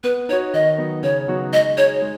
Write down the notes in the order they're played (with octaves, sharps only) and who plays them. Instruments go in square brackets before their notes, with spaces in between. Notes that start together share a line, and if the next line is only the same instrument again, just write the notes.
[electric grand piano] B3 [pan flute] B4
[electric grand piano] D#4 [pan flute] C#5
[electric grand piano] F#4
[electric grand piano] D#3 [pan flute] D#5
[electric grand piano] F#3 B3 D#4
[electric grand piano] C#3 [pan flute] C#5
[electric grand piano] F#3 B3 D#4 F#4
[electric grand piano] G#3 [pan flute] D#5
[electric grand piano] D#4 G#4 [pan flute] C#5
[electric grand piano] G#3